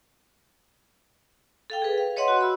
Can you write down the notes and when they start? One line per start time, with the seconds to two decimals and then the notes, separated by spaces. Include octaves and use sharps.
1.70 A4 F5 G5
1.82 G#4 B4
1.98 F5
2.16 B4 C#5 D#5 E5 F#5 C6
2.28 F#4
2.41 B5 E6